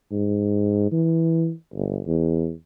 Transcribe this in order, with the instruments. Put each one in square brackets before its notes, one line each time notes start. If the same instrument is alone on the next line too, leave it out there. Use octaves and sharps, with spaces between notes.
[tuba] G#2
E3
G1
E2